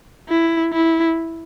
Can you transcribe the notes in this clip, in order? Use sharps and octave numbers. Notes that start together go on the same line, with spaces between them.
E4
E4